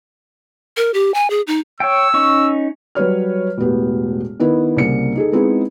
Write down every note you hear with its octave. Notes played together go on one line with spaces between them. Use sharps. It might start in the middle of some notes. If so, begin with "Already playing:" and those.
A#4
G4
G#5
G#4
D#4
C#5 G5 E6
C#4 D#4 C#6
F#3 G3 B4 C#5 F6
E1 A2 B3 G4
D#3 B3 E4
C2 C#3 A#3 C#7
D#4 G#4 A4
G#3 B3 C4 D#4 E4 G#4